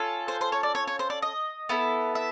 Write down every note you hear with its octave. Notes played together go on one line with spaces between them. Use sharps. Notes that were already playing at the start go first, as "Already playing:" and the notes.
Already playing: C#4 F4 A4
C5
C5
C#5
D5
C#5
C#5
C5
D5
D#5
B3 E4 A4
E5